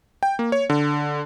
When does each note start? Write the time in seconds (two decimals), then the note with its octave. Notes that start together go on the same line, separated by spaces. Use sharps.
0.23 G5
0.39 A#3
0.52 C#5
0.70 D3